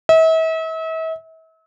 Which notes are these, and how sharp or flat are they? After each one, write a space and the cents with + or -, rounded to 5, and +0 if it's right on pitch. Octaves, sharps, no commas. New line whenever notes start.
E5 -40